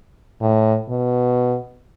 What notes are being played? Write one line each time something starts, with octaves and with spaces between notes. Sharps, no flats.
A2
B2